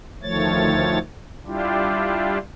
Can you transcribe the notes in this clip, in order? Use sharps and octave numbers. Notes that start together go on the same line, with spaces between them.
D2 D#3 F3 A3 C#5 A6
G3 D4 E4 F4 G4